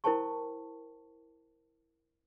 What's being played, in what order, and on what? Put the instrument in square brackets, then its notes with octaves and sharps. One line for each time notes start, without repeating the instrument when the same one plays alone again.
[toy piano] E4 A#4 C5 G5 A5 C#6